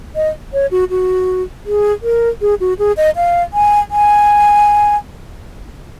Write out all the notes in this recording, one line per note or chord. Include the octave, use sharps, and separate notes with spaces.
D#5
C#5
F#4
F#4
G#4
A#4
G#4
F#4
G#4
D#5
F5
G#5
G#5